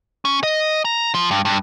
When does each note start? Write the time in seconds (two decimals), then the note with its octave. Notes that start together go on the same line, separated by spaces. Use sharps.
0.25 C#4
0.43 D#5
0.85 A#5
1.15 F3
1.31 G2
1.45 G2